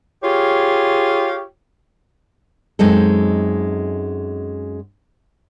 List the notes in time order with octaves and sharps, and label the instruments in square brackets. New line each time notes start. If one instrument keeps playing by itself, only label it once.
[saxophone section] F4 G4 G#4 C#5
[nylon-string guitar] F#2 G#3 C4 D#4 A4